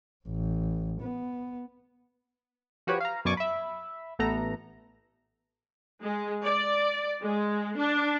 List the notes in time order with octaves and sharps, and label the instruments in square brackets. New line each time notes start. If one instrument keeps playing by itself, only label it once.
[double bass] A1
B3
[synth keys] F3 F#4 G4 B4 C#5
F5 A#5
F#2 B2 D5 G#5 C#6 D6
E5 B5
A1 A3 B3 A4 A#5
[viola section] G#3
D5
G#3
D4